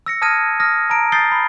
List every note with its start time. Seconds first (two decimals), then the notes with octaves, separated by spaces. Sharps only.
0.06 E6 A#6 C#7
0.22 A5 D#6 F6 G#6 A#6 D#7
0.60 D#6 F6 A#6
0.90 A5 A#5 D7
1.12 D#6 G6 A6 C7 G7
1.32 B5